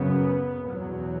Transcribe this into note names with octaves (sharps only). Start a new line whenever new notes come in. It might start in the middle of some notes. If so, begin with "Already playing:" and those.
Already playing: F#2 C#3 B3
E2 B2 F#3